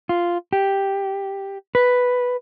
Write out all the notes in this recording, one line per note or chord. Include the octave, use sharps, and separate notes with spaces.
F4
G4
B4